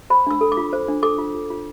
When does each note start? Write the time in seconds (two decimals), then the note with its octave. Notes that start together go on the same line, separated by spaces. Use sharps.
0.10 C5 B5
0.27 D4 E6
0.41 A4
0.52 D6
0.57 F4
0.73 C5
0.88 D4
1.03 A4 D6
1.18 F4
1.34 F4
1.50 F4